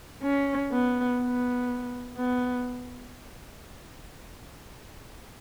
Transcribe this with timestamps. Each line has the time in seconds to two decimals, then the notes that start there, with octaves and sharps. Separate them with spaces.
0.23 C#4
0.71 B3
1.20 B3
2.16 B3